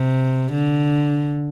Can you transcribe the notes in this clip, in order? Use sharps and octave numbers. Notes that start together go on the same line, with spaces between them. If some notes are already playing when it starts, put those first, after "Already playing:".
Already playing: C3
D3